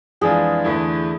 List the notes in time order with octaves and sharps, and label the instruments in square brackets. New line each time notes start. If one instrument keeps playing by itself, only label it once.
[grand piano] F2 E3 G#3 D4 F4 [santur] G#4
[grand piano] E2 D3 A3 E4